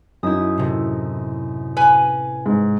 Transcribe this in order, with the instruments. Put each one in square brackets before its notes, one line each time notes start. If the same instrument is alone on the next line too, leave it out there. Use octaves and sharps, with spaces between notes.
[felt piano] F#2 D#4 [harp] E4 D#6
[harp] A2 C3
[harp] C#4 [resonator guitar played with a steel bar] B4 G#5
[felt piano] G#2